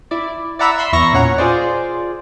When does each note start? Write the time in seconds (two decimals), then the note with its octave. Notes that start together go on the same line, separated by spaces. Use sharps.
0.11 E4 D5
0.59 D5 E5 F#5 A#5 B5 E6
0.78 E5 B5 C6 E6
0.92 E2 E4 A#5 C#6 A#6
1.13 A#2 C#4 C#5 F#5 A#5
1.38 F4 G#4 C5 D5